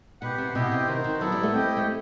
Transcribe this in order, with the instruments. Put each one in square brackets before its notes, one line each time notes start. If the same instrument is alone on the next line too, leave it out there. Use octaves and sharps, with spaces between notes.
[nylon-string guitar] B2 [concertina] G4 B4 F#5
[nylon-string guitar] C3
[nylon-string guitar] B2 [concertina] E4 G4 D#5 G5
[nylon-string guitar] C3
[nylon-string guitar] D#3 [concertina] D#4 F#4 C5
[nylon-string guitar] D#3
[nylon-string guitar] F#3 [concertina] B3 E4 A4
[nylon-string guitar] G3
A3
[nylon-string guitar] C4 [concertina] E4 G4 D#5 G5
[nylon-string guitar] A3